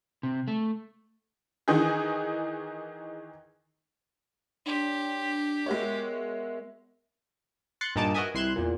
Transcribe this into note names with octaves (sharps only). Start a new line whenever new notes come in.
C3
A3
D#3 E3 D#4 G#4
D4 G4 C#5 G5 C6
G#3 B3 F#4 A#4 C#5 E5
C6 F#6 A6 C#7
G2 A#2 D#4 A5 D6 A6
F#4 A#4 B4 D#5 E5 G#5
C2 E4 C6 F#6 G#6 E7
E2 A#2